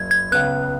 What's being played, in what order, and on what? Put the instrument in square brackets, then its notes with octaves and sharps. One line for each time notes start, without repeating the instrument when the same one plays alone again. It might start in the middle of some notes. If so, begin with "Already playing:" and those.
Already playing: [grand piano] F#1 F#2 [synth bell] G#6
[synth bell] G#6
[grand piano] C#2 C#3 B3 [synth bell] F#6